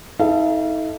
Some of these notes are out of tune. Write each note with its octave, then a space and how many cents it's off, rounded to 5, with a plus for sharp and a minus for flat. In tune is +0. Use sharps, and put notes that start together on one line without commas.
D#4 +40 A4 -10 F5 -40